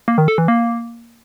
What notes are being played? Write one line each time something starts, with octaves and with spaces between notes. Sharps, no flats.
A#3
D#3
A4
E3
A#3